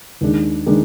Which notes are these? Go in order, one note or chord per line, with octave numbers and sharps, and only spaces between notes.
D#2 D#3 G#3 D4
D#3 G#3 D4